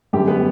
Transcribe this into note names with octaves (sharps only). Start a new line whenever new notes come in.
F#2 D3 G3 B3 G4
B3 B4